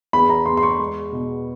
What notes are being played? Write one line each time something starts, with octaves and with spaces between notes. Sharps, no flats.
E2 B5
A#5
E2 C6
C6
C#6
G#3
B2